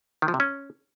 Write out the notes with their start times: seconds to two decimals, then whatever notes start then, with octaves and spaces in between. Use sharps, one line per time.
0.22 D#3
0.28 F3
0.34 C3
0.40 C#4